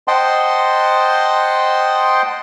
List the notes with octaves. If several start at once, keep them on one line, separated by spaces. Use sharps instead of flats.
C5 D#5 F#5 G5 A5 C6